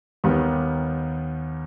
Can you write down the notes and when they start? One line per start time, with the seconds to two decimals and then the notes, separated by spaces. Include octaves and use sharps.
0.24 D#2 D#3 G3 B3